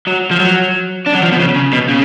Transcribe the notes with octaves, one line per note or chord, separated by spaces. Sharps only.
F#3
F3
F#3
D4
F#3
F3
B2
C#3
C#3
B2
C#3